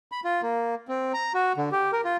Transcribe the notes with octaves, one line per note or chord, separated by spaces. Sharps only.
B5
F4
A#3
C4
A#5
F#4
D3
G4
A#4
F4